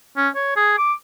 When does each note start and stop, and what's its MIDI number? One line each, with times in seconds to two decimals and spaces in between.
0.17 0.29 61
0.35 0.53 73
0.56 0.76 68
0.78 0.93 86